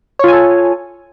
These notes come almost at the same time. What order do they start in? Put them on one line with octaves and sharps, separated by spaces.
C#5 F4 G#5 A4